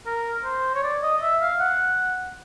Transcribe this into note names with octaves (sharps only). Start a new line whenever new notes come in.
A#4
C5
C#5
D5
D#5
E5
F5
F#5